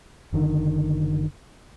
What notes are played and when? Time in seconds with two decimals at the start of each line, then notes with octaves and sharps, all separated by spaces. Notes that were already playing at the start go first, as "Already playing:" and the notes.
0.33 F#1 D3 D#3